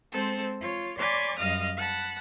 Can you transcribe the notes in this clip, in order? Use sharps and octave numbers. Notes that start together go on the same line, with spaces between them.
G#3 C4 A4 C5
F4 C#5
C#5 D5 G#5 B5 C6 D6
F#2 G3 D#5 F5 D#6 F6
F#5 A5 B5